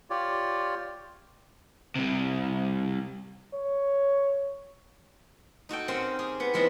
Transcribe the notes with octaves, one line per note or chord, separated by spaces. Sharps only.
F4 G4 C#5 D5
C2 C3
C#5
D#4 F#4 A4 G5
C4 C#4 A#4 F#5 G5
G4 G#4
B3 F#5
F3 G#3 B3 C4 E4